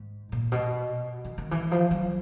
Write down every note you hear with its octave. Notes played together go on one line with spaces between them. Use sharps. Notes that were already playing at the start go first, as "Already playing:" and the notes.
Already playing: G#2
A#2
B2
D#3
D#3
E3
F3
F#3